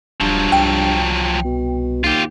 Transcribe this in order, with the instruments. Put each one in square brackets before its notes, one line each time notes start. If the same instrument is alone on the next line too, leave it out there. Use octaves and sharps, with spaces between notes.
[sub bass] D#1 [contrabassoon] G2 [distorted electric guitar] F3 F#3
[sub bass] C2 [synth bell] G5
[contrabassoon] B2
[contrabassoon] D#2 [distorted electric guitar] F4 G4